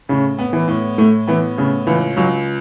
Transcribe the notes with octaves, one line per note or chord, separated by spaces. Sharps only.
A2 C#3
B3
E3
A2
A2 A3
E3 B3
A2 C#3
C#2 E3
C#2 F#3